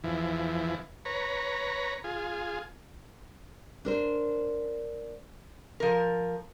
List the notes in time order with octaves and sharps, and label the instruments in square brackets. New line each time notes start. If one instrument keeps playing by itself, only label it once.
[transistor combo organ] E2 E3 F3
B4 C#5 A#5
F4 G#4
[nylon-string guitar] D4 A#4 C5
[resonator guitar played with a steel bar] F3 A#4